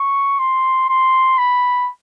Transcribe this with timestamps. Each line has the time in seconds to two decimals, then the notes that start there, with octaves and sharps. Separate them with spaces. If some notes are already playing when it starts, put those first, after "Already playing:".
Already playing: C#6
0.39 C6
0.89 C6
1.38 B5